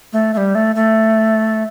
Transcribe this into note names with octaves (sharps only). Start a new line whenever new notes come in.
A3
A3
G3
A3
A3